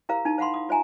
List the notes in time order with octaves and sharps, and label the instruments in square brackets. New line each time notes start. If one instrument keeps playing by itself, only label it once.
[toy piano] E4 G4 A#4 C5 F5 A#5
D#4 E4 A5
C5 F5 F#5 B5 C6
F5 D#6
F4 C5 E5 G#5 A#5